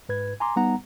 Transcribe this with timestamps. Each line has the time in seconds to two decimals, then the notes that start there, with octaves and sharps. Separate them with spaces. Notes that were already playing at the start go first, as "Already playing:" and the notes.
0.09 G#2 B4 G#6
0.40 G#5 A#5 C6 D6
0.56 G3 B3 D#4 F#5 A#5